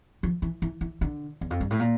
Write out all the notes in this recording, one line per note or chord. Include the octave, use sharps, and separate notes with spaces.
F3
E3
E3
E3
D3
E2
F2
G2
A2
A#2